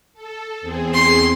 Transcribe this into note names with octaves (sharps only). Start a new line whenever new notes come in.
A4
E2 C4 G#4
C6